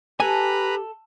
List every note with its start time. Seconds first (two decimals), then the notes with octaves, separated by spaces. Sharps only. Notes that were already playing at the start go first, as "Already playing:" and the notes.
0.20 G4 A4 B4 G#5 A#5 B5